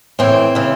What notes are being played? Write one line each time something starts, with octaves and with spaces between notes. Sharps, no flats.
A2 E3 C4
C#3 E3